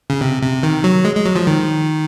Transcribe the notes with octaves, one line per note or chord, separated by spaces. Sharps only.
C#3
C3
C3
D#3
F#3
G#3
G#3
F#3
F3
D#3